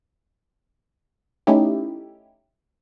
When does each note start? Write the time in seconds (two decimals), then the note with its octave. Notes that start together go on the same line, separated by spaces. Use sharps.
1.47 A3 C#4 D#4 E4 G4